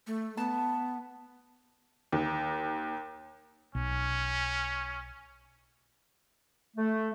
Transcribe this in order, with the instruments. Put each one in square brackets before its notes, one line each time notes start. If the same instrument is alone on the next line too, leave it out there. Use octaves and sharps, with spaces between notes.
[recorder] A3
[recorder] B3 [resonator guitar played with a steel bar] A5
[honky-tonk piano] D#2
[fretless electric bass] B1 [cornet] C#4
[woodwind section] A3